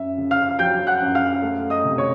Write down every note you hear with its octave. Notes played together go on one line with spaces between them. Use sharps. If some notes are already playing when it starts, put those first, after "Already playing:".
Already playing: F#2 E5
C#3
F5 F6
F#3 G5 G6
F#5 F#6
F#2
F5 F6
A3
D#5 D#6
C3
C#5 C#6